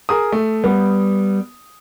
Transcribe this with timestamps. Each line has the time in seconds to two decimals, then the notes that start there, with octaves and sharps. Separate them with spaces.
0.09 G#4 A#4 D#6
0.32 A3
0.64 G3 B3